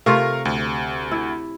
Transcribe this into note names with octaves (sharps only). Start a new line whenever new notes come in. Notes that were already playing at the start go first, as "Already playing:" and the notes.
C3 A3 F4 A#4 F5 C#6
D2
E4